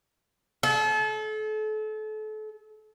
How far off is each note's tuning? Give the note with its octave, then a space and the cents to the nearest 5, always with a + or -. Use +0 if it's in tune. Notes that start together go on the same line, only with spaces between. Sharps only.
A4 -35